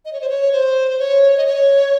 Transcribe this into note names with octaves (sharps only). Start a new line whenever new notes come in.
D#5
C#5
C5
C#5
C5
C#5
D#5
C#5